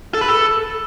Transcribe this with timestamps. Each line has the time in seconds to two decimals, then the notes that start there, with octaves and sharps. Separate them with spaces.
0.14 A4
0.21 B4
0.28 A4